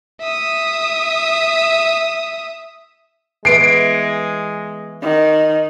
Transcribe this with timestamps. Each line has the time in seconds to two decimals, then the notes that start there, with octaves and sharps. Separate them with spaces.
0.21 E5 D#6
3.45 E3 G#3 B3 C7 D7
5.03 D#3